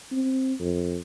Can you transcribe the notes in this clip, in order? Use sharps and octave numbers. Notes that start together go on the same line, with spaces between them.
C4
F2